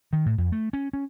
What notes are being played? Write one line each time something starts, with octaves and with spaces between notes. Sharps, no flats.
D#3
A2
F2
A3
C#4
C#4